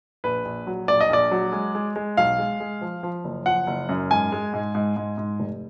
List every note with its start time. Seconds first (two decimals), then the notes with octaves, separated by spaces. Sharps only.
0.24 A#1 B4
0.45 A#1
0.67 F#3
0.88 A#1 D5
1.01 D#5
1.10 A#1 D5
1.31 F#3
1.52 G#3
1.75 G#3
1.96 G#3
2.17 B1 F5
2.39 G#3
2.60 G#3
2.81 F3
3.03 F3
3.25 F#1
3.46 F3 F#5
3.67 F#1
3.89 F#2
4.10 G#2 G#5
4.32 G#3
4.53 G#2
4.75 G#2
4.97 G#2
5.18 G#2
5.40 F1